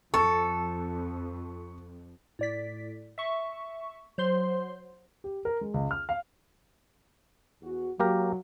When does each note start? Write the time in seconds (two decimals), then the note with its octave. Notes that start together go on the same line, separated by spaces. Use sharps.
0.14 F2 A4 C#6
2.39 A2 D5 B6
3.18 E5 C#6
4.18 F#3 C5 C6
5.24 G4
5.45 A#4
5.61 G#3
5.74 C#2
5.91 F6
6.09 F5
7.62 E2 F#4
8.00 F#3 A#3 G4 A#4